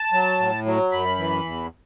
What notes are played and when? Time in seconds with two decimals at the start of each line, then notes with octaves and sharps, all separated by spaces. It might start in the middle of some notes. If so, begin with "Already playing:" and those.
Already playing: A5
0.12 F#3
0.39 A2
0.65 F#3
0.92 F#2 B5
1.18 E3
1.45 E2